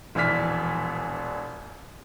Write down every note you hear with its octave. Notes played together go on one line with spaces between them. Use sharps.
E1 A#1 E3 D5 F6 B6